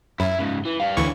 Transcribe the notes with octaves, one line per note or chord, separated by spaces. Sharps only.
F#2 E4
G#2 C#3
E3
G3 F5
D2 E3 D4 C#5 C#6